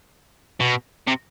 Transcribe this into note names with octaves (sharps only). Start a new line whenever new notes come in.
B2
C3